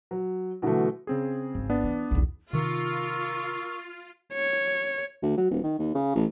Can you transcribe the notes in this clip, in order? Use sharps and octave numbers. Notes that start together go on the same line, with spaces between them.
F#3
B2 D3 E3 F#3 A3
C#3 C4 G#4
G#1
B3 D4 D5
E3
B1 E2
C3 D#3 F4 A#4 C#6 E6
C#5
D2
F#3
D#1
D#3
D#2
C#3
A1